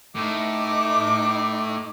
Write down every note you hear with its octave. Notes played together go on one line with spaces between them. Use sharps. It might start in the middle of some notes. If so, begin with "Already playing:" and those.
A2 D#4 D6